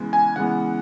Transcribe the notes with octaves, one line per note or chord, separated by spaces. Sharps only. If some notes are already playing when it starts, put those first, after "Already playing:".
Already playing: C#3 E3 G#3 B3
G#5
C#3 E3 G#3 B3 F#5